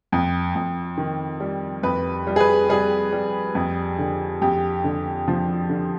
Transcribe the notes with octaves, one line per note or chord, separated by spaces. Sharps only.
F2
F2
D#3
G3
F2 B4
G3
G#4
B4
G3 G#4
G3
F2
D3
F2 G4
D3
F3
D3